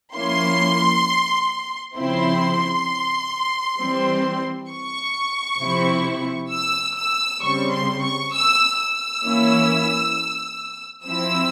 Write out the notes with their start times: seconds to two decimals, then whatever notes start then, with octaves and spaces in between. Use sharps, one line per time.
0.15 F3 A#3 C#4 E4 C6
1.97 C#3 F3 C4 E4 C6
3.79 E3 G3 C4
4.70 C#6
5.60 C3 F3 C4 E4
6.51 E6
6.96 E6
7.42 C#3 G3 C4 C#6
7.72 C6
8.03 C#6
8.33 E6
8.79 E6
9.24 E3 A#3 C#4 E4
11.06 F3 C4 E4 E6